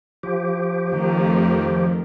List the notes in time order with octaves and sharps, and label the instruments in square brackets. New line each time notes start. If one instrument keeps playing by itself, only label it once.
[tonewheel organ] F3 G4
[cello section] F2 D#3 A3